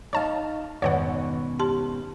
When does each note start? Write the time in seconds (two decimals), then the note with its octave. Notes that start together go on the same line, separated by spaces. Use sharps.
0.13 D#4 C#5 F5 A5
0.82 F2 G#2 B2 D#3 C#4 C#5 D5 F#5
1.59 G4 A5 C6